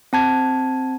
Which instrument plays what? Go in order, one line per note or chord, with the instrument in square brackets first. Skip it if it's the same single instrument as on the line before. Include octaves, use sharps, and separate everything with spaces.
[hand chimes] C4 A5 G#6